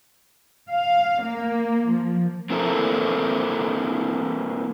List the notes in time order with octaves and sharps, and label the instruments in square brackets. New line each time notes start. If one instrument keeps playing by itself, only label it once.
[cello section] F5
A#3
F3
[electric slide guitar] A#3 C4 E4 A4 A#4